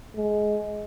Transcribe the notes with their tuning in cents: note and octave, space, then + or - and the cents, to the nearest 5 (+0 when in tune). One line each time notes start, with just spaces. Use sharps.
G#3 +15